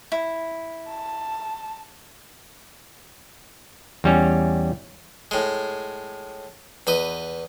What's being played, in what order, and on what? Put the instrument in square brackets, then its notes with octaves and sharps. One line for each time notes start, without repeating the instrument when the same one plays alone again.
[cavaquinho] E4
[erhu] A5
[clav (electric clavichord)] E2 G3 C#4
[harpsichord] A2 G#3
E2 B4 D#5